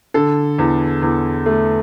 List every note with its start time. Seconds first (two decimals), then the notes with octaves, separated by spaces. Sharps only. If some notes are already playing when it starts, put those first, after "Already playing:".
0.14 D3 A4
0.59 E2
1.02 E2
1.46 A3